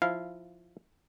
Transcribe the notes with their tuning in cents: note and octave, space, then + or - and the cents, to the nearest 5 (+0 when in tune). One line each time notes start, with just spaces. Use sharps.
F3 +0 E4 +0 F5 -10